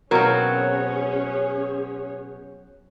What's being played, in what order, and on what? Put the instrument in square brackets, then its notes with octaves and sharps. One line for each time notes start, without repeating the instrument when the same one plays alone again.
[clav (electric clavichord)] B2 [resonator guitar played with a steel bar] F#3 C4 [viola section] C#4 G#4 C#5 [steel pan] A#4